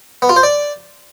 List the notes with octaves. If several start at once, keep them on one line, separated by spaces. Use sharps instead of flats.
B3
F4
C5
D5